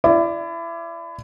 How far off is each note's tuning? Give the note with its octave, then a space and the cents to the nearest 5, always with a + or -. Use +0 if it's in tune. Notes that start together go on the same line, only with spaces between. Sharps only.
E4 +30 D5 +0